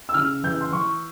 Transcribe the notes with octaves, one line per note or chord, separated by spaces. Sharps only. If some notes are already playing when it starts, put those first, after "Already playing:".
E6
C#3 F6
E3 G6
C6
E3 C#6